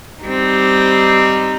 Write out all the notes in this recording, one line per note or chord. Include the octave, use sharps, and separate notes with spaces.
G3 C4 D#4